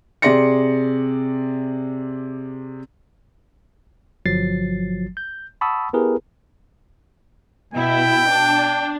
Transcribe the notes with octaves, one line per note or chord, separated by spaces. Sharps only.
C3 G#4 D5 C6 A#6 C#7
G1 F3 F#3 A6 C7
G6
F#5 A5 B5 C#6 D#6 E6
B3 E4 G4 G#4 A#4 B4
B2 E4 G5
D4